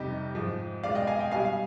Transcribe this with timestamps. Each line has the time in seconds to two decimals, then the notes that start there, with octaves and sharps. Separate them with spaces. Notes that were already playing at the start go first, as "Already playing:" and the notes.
Already playing: F2 C3 G3 D#4 G4
0.35 G#2 F3 G#3
0.83 B2 G#3 D5 F5
0.95 D#5 G5
1.07 F5 G#5
1.19 D#5 G5
1.31 B2 G3 F5 G#5
1.45 F5